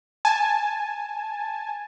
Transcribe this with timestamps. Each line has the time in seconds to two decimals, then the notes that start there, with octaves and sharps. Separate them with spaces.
0.25 G#5 A5